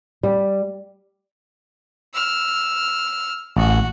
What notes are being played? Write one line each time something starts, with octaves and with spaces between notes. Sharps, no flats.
G3
E6 F6
A1 F#4